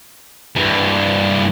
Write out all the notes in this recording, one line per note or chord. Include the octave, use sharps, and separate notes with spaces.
G2 E3